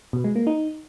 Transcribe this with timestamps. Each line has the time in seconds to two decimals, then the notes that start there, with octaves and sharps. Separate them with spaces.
0.13 B2
0.24 G#3
0.36 A#3
0.47 D#4